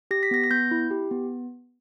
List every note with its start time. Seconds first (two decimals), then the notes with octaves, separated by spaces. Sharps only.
0.11 G4 A#6
0.23 B6
0.31 B3 A#6
0.44 A#6
0.51 B3 G6
0.71 E4
0.91 G4
1.11 B3